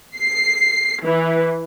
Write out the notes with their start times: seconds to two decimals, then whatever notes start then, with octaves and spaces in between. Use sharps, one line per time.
0.17 C7
1.04 E3